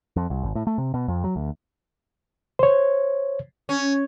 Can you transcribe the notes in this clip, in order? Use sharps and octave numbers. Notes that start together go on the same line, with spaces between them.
F2
C2
G#1
A2
A3
C3
B2
F2
F#3
D2
C5 C#5
C#4